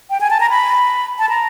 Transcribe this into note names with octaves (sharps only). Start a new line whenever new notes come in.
G5
G#5
A5
A#5
B5
A5
A#5